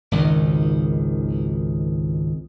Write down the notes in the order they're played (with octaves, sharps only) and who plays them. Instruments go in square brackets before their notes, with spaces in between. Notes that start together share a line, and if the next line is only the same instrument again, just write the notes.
[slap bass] G#1 C#2 D#3